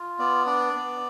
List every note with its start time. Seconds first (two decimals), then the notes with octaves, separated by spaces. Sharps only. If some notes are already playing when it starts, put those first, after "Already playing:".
Already playing: F4
0.19 B3 D5
0.47 D4 D5
0.75 B3